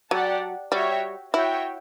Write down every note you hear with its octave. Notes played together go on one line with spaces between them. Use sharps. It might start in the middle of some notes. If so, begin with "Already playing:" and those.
F#3 G4 D5 F#5 A5
G3 F#4 C#5 E5 G5
E4 F#4 C#5 E5 G5